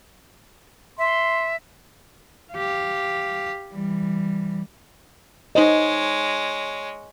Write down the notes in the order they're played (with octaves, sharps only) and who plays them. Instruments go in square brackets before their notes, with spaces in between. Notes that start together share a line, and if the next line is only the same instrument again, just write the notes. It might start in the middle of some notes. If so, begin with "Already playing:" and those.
[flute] E5 [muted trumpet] C6
[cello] G4 F5
E3 G3
[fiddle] G#3 C#5 [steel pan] D#4 C5 D#5